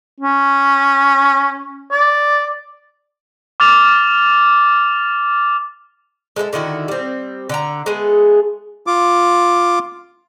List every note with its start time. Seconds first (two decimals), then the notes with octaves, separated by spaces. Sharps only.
0.20 C#4
1.92 D5
3.60 D6 F6 A6 F7
6.36 G#3 A4 B4 E5
6.53 D3 D#3 E4 F#4
6.88 G3 C4
7.49 D3 G5 A#5
7.86 G#3 A3 B3 G#4
8.87 F4 D6